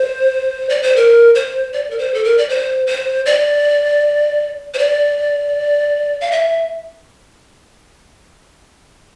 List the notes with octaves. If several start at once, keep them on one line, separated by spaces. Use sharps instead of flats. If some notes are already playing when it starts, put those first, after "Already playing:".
Already playing: C5
D5
C5
A#4
C5
D5
A#4
C5
A4
A#4
D5
C5
C5
D5
C5
D5
F5
E5